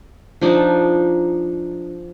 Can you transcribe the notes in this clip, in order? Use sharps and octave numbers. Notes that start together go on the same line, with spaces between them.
F3 D4 D#4